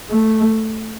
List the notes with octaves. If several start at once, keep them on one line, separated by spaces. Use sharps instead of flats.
A3